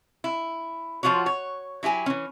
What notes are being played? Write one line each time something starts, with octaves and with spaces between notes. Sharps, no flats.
E4
F3 F#3 F4 F#4 C#5
C#5
F#3 E4 G4 G#5
E3 C#4